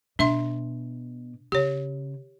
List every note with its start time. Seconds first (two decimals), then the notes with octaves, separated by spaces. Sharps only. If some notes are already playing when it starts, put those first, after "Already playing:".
0.19 B2 D4 E5 C6
1.52 C#3 G4 C#5